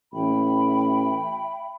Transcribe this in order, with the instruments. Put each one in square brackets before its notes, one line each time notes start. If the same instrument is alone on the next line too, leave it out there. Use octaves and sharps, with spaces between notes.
[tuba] A1 [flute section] E5 G5 B5